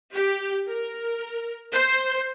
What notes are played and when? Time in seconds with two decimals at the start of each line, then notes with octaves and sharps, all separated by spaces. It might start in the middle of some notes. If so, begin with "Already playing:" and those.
0.13 G4
0.69 A#4
1.72 C5